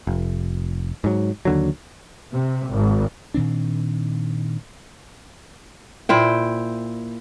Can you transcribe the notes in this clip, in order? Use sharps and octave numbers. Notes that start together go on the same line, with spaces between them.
F1
G#2 F#3
D#2 D3 F#3
C3
G#1
A#2 D#3 C4 D4
A#2 E4 C5 G5